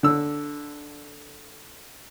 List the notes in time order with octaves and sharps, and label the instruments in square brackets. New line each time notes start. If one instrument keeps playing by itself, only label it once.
[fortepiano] D3 E6